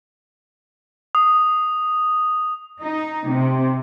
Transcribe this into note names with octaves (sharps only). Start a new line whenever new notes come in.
D#6
D#4
C3